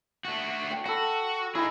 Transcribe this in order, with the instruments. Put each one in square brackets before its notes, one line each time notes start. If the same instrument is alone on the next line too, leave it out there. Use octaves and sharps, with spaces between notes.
[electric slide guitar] A3 F#4
[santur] G5
[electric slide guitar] F#4 [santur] A4 B5
[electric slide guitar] D#4 G#4 [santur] E4